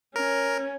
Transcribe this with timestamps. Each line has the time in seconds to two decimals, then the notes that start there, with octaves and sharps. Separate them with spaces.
0.15 C#4 A#4